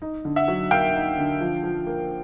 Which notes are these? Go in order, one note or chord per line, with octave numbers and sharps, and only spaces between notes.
D#4
D3
E5 F#5
F#3
A#3 F5 G5
D#4
D3
F3
F3
A#3